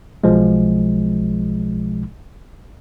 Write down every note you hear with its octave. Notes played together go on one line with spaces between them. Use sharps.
B1 B2 F3 G#3